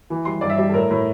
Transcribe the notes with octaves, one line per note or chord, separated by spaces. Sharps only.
E3
G3 C6
G2 D5
E5
G3 D5
A4
A2 A#4
A2